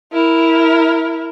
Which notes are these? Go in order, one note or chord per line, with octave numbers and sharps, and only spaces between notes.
E4 A#4